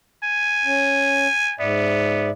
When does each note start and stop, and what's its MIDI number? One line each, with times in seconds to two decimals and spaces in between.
0.23 1.55 80
0.65 1.27 61
1.60 2.30 44
1.60 2.30 59
1.60 2.30 74
1.60 2.30 76